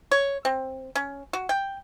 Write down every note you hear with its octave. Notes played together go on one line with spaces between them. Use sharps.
C#5
C4
C#4
F#4
G5